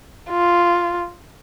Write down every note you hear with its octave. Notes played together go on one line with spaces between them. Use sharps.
F4